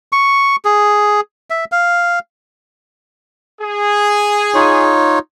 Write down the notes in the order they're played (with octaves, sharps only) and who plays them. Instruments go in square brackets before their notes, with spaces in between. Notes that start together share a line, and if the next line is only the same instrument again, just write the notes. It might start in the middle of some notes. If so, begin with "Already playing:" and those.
[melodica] C#6
G#4
E5
F5
[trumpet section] G#4
[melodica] D#4 F4 C#5